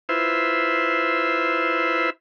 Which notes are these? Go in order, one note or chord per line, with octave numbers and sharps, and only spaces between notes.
E4 F4 B4 C5 E5